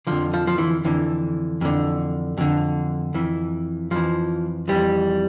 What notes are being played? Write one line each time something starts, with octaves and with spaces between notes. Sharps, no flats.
F2 D3 F3
F3
F3
E3
F2 D3 E3
F2 D3
F2 D3
F2 E3
F2 E3 F3
F2 E3 G3